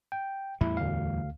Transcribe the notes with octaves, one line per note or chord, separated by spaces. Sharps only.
G5
E2 A2 G3 E4
D2 F5